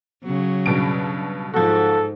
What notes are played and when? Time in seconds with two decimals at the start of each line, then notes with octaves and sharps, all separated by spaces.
0.23 C#3 F#3
0.66 G2 B2 D7
1.54 G#2 F3 F#4 A4